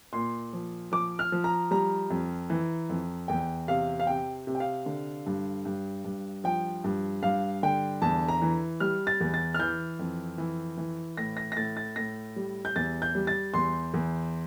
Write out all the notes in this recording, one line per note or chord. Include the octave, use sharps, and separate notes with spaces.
A#2 C6
F3
F3 D6
F6
F3
A#5
G3 A#5
F2
E3
F2
E2 G5
C3 F5
F5
C3 G5
C3
G5
F5
D3
G2
G2
G2
F3 G5
G2
G2 F5
D3 G5
E2 A5
A#5
E3
G3 F6
A6
E2
A6
F6
E3 G6
F2
E3
E3
A2 A#6
A#6
A#6
A2 A6
A6
A2 A#6
G3
G6
E2 A6
G6
G3
A6
E2 C6
E2